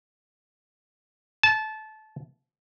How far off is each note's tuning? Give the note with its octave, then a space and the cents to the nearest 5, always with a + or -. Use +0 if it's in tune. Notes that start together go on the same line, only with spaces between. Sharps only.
A5 -20